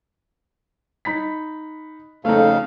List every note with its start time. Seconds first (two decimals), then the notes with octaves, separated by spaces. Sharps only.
1.05 D#4 B5 B6
2.25 F2 C#3 A3 D#4 F5